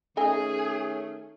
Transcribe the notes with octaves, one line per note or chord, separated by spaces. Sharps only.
D#3 A3 C#4 G#4 A4 D#5 G#5